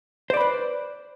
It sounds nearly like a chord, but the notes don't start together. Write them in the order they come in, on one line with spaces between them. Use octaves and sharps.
C5 D5 B5 B4